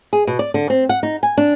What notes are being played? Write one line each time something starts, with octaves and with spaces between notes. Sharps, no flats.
G#4
B2
D5
D3
C4
F#5
D#4
G#5
D4